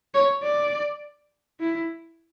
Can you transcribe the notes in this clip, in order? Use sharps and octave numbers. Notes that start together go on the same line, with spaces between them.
C#5
D5
E4